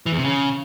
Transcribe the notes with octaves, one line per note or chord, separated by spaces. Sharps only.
E3
E2
C3
C#3